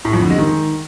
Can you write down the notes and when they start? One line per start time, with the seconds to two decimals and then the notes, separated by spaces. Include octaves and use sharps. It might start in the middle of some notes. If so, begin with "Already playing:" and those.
0.05 A2
0.13 F2
0.22 D3
0.30 G#3
0.39 D#3